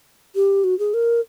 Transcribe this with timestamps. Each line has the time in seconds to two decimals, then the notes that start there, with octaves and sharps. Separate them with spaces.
0.35 G4
0.64 F#4
0.79 G#4
0.94 A#4